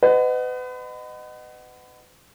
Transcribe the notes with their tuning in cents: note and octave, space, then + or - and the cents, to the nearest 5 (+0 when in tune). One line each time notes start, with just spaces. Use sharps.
B4 +35 D#5 -20 F#5 +10